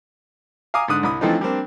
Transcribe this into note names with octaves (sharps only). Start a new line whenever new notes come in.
F5 G#5 A#5 D6 D#6
G#2 D3 D#6 F#6
C2 B5 D#6
E3 F3 A3 C4 D4 D#4
G3 A#3 C4 D4